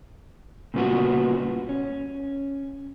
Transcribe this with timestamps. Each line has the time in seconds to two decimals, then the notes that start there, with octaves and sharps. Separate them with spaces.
0.74 A#2 C#3 G3 B3 F4 F#4
1.69 C#4